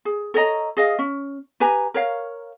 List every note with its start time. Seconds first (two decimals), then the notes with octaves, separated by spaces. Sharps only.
0.05 G#4
0.34 A4 C#5 D#5 A#5
0.77 G#4 D#5 F5
0.99 C#4
1.60 G4 B4 G#5 A#5
1.94 A#4 C#5 F5